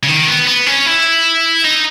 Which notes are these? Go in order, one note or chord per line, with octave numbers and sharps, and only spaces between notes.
C#3
D#3
B3
B3
C#4
E4
D#4